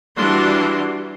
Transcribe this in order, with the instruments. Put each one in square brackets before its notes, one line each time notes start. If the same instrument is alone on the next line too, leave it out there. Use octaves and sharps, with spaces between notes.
[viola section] E3 G3 D4 F#4 C6